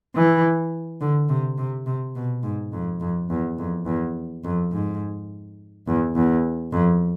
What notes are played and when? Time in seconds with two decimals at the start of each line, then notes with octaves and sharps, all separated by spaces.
0.15 E3
1.01 D3
1.29 C3
1.58 C3
1.86 C3
2.15 B2
2.43 G#2
2.73 F2
3.01 F2
3.30 E2
3.58 F2
3.86 E2
4.44 F2
4.72 G#2
5.87 E2
6.16 E2
6.72 F2